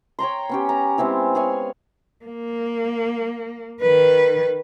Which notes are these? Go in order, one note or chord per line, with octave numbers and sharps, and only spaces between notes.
C#5 G5 A#5 C6
B3 C#4 G4
A#5
G#3 B3 C4 E4
G#4 C#5 F5 G#5
A#3
D#3 B4